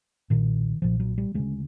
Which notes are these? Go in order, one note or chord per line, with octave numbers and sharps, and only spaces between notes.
B1 A#2 D#3
B1 A#2 F3
F#3
G3
D2 C#3 G#3